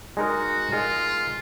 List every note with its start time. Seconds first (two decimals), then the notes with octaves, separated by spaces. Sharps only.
0.17 G#3 D#4 F#4 A#4
0.72 G#3 D#4 F4 A#4